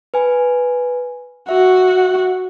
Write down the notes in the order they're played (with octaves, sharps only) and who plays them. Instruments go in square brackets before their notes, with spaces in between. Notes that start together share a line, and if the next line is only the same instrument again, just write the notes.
[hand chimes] B4 G#5
[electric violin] F#4 [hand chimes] E5